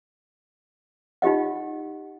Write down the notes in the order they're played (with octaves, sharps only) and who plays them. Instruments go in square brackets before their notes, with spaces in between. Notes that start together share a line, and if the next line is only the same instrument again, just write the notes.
[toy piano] D#4 F4 G4 D#5 F#5